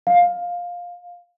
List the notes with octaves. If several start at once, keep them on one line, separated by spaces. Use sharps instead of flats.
F5